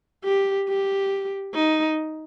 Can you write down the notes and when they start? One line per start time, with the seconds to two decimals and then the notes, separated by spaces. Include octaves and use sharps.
0.24 G4
0.68 G4
1.54 D#4